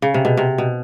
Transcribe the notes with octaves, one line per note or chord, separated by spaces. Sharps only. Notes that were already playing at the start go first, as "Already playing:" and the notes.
C#3
C3
B2
C3
B2